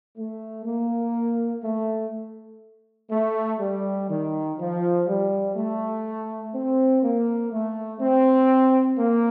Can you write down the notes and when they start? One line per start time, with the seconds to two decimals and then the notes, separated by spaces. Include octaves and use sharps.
0.18 A3
0.66 A#3
1.64 A3
3.11 A3
3.61 G3
4.09 D#3
4.59 F3
5.08 G3
5.56 A3
6.55 C4
7.03 A#3
7.52 A3
8.01 C4
8.99 A#3